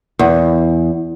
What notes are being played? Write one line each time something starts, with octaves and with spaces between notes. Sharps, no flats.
E2